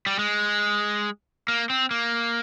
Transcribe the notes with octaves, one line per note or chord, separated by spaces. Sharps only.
G3
G#3
A#3
C4
A#3